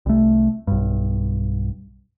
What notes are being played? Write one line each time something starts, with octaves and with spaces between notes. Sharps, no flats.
C2 A3
B1 G2